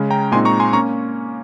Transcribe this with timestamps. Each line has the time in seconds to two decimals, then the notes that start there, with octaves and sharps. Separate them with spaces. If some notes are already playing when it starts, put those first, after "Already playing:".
Already playing: C#3 G#3 C#4
0.10 G5 A#5
0.32 A#2 G#3 C4 D#4 G#5 C6
0.45 A#5 C#6
0.60 G#5 C6
0.73 A#3 C#4 A#5 C#6